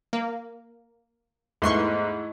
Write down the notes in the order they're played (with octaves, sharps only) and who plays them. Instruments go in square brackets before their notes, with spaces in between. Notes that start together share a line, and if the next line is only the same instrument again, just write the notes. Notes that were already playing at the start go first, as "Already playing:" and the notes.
[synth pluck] A#3
[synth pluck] E2 C6 C#6 [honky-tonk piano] G#2 [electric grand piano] A3 E4